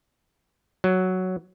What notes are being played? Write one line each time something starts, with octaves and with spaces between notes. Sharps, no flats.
F#3